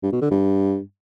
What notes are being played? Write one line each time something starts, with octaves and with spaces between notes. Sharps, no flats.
G2
B2
D3
G2